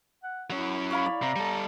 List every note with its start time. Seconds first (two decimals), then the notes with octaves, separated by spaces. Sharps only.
0.24 F#5
0.50 F#3 C#4 E4
0.91 C#5 F5 B5
1.06 E4 D5
1.22 C3 A#5
1.36 G3 A4